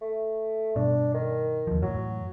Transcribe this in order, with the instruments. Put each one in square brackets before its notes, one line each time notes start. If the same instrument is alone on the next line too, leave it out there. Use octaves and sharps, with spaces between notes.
[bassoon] A3
[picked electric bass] G2 B2 [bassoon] D4
[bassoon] D#3
[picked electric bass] D#2 F3
[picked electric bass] F#2 A2 E3 [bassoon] F#3